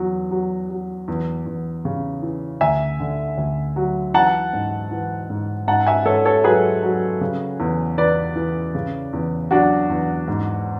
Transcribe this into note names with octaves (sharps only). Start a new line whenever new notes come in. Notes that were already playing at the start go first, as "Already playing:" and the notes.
Already playing: E2 F#3
F#3
F#3
E2
E2
C#3
E3
D2 E5 G#5
D3
D2
F#3
E3 F#5 A5
G#2
E3
G#2
G#2 F#5 A5
E5 G#5
G#2 A4 C#5
A4 C#5
F#3 G#4 B4
F#3
C#3
E2
E2 B4 D5
E3
C#3
E2
F#3 D4 F#4
E2
G#2